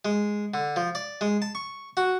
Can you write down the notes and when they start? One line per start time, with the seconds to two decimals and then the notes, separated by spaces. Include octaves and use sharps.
0.05 G#3
0.54 D3
0.76 F3
0.95 D5
1.21 G#3
1.42 A5
1.55 C#6
1.97 F#4